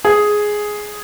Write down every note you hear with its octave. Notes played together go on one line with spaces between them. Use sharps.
G#4